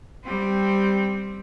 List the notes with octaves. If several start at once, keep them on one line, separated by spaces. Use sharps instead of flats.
G3 C4